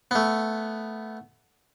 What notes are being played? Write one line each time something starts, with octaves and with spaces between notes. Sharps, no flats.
A3 B3